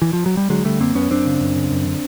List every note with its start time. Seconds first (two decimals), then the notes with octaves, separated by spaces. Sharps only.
0.02 E3
0.13 F3
0.26 F#3
0.37 G3
0.50 D3 F#3 G#3
0.65 D3 G3 A3
0.80 F#2 A#3 C4
0.95 F#2 B3 C#4
1.10 F#2 C4 D4
1.26 C#3
1.40 F#2
1.56 C#3
1.71 F#2
1.86 D3